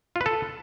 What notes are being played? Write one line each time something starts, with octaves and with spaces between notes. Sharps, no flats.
F4
B4
A4